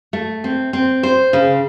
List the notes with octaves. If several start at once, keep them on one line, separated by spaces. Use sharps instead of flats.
A3
C4
C4
C5
C#3